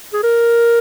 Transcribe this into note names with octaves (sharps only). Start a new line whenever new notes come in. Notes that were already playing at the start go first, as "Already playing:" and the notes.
G#4
A#4